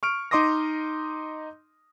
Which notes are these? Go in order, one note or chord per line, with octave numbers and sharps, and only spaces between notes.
C#6 F6 D7
D#4 D#5 C6 D6 D#6 A#6